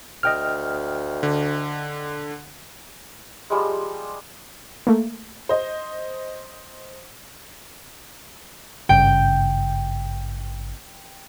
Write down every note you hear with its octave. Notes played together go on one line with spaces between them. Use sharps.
D2 D#5 G5 F6
D3
F3 G3 G#3
A3 A#3
C5 D#5
G#1 G2 C#3 G5